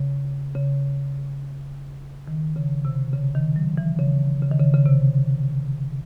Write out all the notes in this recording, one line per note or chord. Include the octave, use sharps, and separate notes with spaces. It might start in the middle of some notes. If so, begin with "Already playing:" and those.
Already playing: C#3
C#3
D#3
C#3
C3
C#3
D#3
F#3
E3
C#3
C#3
D#3
C#3
C#3
C3